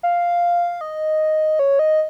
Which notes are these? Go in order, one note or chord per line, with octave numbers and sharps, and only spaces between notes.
F5
D#5
C#5
D#5